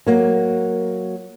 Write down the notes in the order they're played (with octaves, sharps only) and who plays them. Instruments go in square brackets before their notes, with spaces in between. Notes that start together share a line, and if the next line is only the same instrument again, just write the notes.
[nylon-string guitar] F#3 A#3